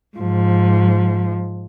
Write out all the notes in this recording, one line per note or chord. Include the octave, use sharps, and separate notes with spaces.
G#2 F3